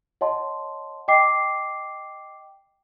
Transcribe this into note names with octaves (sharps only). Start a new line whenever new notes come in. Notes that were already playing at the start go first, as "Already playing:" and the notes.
C#5 D#5 F#5 A5 C6
D#5 G5 D6 C7